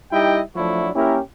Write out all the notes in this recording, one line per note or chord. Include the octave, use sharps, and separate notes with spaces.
G3 D#4 E4 G4 D#5 G5
F3 F#3 A3 D4 E4 F#4
A#3 C#4 E4 G4 A#4